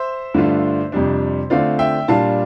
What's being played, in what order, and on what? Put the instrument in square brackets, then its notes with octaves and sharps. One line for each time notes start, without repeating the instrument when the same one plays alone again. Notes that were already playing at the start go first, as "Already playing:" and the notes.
Already playing: [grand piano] C5 E5
G2 D3 A3 D4 F4
F2 C3 G3 D4
D3 A3 C4 F4 D5 F5
E5 G5
A#2 G3 D4 F4 F5 A5